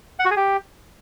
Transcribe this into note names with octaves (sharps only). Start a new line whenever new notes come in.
F#5
F#4
G#4
G4